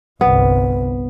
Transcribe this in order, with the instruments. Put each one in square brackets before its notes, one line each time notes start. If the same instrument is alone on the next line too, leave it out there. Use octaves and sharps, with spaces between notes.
[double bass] G1 C2 [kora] B3